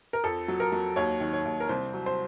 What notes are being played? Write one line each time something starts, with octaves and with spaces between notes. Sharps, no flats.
A#4
F2 A4
F#3
A#4
F#3
D#2 C#5
D#3
C#5
D#2
A#4
C2 C5
F#3
C5